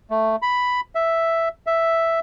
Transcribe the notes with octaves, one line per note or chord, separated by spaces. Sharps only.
A3
B5
E5
E5